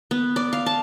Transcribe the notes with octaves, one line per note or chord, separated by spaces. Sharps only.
B3
D5
F5
A5